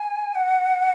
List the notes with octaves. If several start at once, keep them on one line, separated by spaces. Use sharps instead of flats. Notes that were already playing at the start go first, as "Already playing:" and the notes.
Already playing: G#5
F#5